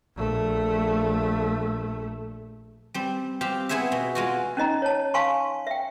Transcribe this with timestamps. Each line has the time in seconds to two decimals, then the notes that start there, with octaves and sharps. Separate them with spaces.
0.16 A#1 A3
2.94 G3 C4
3.41 C4 G4 F5
3.69 B3 E4 G#4 C5 E5
3.92 B2
4.15 G#3 F4 F#4
4.57 C#4 D#4 D#5 A#5
4.82 C#5 A5
5.14 F5 G#5 A5 C6 C#6
5.67 E5 G5